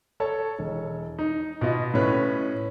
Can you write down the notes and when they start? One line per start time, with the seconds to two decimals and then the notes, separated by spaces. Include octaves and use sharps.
0.20 A4 C#5 A5
0.59 E1
1.19 D#4
1.61 B2 F4 D#5
1.94 A2 C#4 B4